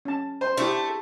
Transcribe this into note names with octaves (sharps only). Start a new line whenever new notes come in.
C#4 A5
C5
A3 D4 E4 G4